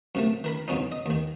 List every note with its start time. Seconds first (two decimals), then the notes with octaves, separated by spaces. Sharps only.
0.15 F#2 C3 A3
0.44 D#3 A#4 B5
0.68 B1 E2 B2 C#4 D#4
0.92 D#5
1.06 D#2 D#3